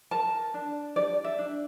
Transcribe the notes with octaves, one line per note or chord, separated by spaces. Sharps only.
A#4 A5
D4
G4 D5
E5
D4